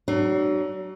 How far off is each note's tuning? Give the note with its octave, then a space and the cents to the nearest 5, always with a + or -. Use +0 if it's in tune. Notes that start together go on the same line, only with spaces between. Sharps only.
F#3 +35 D4 +45